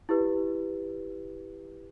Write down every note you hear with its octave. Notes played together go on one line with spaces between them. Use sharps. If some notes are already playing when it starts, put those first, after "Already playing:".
E4 G4 B4